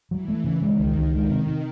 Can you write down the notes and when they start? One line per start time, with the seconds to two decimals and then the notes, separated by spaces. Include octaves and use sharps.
0.10 E3 F#3
0.28 A3
0.44 C#3
0.61 D#3 G#3
0.79 C#2
0.96 C#2
1.13 D#3 G#3
1.30 C3
1.46 C3